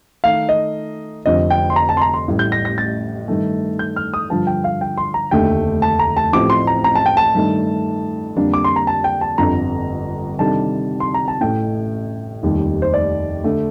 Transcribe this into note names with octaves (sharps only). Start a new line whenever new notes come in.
D#3 A3 D#4 F5
D#5
F1 F2 D3 F3 C4 D#5
G5
C6
A#5
A5
C6
A#5
C6
A1 A2 G3
G6
A#6
A#6
A6
G2 D#3 A3
G6
F6
D#6
G2 D3 F3 A5
G5
F5
G5
C6
A#5
F1 D#2 D3 A3 G5
A5
A#5
A5
A1 A2 F3 C4 G4 D6
C6
A#5
A#5
A5
G5
A5
G2 D#3 A3 D4
F2 D3 G3 A#3 D4
D6
C6
A#5
A5
G5
A5
G1 F2 D3 A#5
C3 D#3 G3 D4 A4 A5
C6
A#5
A5
A1 A2 A3 G5
F1 D#2 D#3 G3
C5
D5
D3 A3